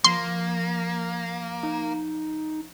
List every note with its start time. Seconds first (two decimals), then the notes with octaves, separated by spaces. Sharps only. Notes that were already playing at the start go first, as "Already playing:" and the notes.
0.04 F3 A#3 C6
1.63 D#4